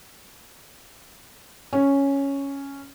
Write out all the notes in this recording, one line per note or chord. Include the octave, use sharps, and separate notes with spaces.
C#4